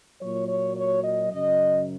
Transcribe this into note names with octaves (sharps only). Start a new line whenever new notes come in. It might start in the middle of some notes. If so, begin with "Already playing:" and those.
A#2 F#3 C#5
C#5
C#5
D#5
F#2 C#3 F#3 D#5